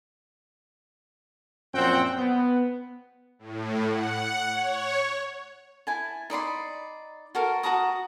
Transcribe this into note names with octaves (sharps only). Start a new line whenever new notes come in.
F#2 A#2 F3 C4 F#5 G5
B3
A2
F#5
C#5
E4 G#5 A5
D#4 D5 B5 C6
F#4 A4 A#4
F#4 A5 A#5 D#6